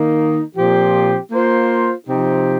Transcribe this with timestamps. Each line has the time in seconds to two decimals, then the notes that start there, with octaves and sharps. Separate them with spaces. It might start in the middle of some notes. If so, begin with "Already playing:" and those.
Already playing: D#3 A#3 D#4
0.56 A#2 F3 C4 G4
1.31 A#3 F4 C5
2.06 C3 F3 C4 D#4 G4